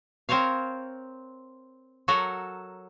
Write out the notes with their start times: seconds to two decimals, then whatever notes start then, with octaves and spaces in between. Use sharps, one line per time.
0.29 C4 A#4 C5 C#5 F5
2.08 F#3 F#4 A4 A#4